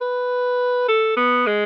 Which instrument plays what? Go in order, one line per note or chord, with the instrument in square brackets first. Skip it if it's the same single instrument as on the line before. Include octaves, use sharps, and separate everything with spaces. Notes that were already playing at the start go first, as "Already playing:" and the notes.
[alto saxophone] B4
A4
B3
G#3